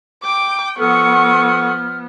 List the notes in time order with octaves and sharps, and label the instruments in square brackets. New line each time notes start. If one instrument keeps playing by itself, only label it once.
[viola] G5 [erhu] D6
[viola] F3 B3 [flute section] A4 F#5 D#6 [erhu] C#6 [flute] F6